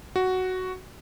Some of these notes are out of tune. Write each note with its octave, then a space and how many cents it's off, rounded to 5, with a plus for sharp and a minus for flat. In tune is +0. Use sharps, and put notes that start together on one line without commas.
F#4 +5